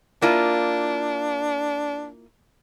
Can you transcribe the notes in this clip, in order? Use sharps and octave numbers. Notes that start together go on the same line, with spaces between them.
A#3 D4 E4 F4